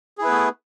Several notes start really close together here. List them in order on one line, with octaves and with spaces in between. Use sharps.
G#4 E4 B4 B3 A3